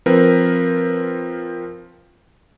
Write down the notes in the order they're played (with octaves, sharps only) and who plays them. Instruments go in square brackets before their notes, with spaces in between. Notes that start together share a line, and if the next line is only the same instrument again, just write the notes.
[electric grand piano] F3 C4 A#4 B4